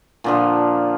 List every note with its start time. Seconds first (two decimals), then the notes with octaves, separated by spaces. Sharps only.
0.24 A#2 D3 F3